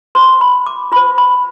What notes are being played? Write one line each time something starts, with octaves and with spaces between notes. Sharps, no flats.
F4 C5 C6
B5
D6
F4 C5 B5
B5